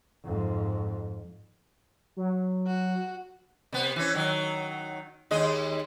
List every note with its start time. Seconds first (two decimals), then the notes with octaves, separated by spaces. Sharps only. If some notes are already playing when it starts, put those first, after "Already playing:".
0.25 F2 G#2
2.17 F#3
2.67 F#4
3.72 C3 B3
3.96 E3 C#4
4.14 D#3 F#3
5.31 D#2 G#3 D#5